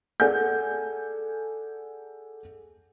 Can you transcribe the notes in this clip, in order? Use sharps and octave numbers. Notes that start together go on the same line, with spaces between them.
G#4 A4 D5 F#5 G#5 G6